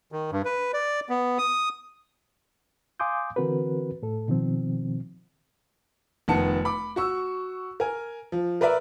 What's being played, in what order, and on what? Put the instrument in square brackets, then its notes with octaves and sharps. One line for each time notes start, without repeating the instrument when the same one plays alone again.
[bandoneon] D#3
G2
B4
D5
B3
D#6
[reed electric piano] F5 G#5 C6 D6 D#6 G6
D3 E3 C4 F#4 A#4 B4
A2 A4
B2 D#3 F3 C4
[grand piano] F1 D#3 B3 A5 C#7
B5 D6
F#4 C#6 E6
A#4 G#5
F3
A#4 B4 D5 E5 A#5